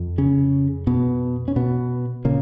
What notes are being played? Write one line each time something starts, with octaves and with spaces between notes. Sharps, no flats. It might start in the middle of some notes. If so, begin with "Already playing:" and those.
Already playing: F2
C#3 C#4
B2 B3
C#4
B2 B3
A#2 C#3 A#3